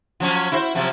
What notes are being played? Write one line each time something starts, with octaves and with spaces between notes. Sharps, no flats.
F3 F#3 C#4
E4 F#4 C5
C3 F3 F#3